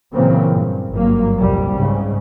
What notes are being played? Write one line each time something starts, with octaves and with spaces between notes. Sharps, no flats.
A#2 C#3 E3 F#3 A#3 C4
G2
G#1 G2 F#3 A#3
C2 F2 A#2 G3
G#2 C#3